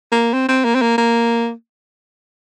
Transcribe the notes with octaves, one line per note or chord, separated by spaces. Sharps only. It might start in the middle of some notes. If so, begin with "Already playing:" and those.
A#3
C4
C4
A#3
C4
A#3
A#3